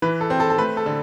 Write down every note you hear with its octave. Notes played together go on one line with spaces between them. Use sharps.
E3 B4
A4
C4
A4
A4
A3 B4
A4
D3